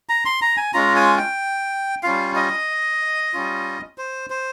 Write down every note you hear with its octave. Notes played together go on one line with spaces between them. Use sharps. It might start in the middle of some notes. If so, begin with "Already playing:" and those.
A#5
C6
A#5
G#5
G#3 C#4 F4 A#5
G#5
G5
G3 C#4 F4 F5
D#5
G3 C#4 F4
C5
C5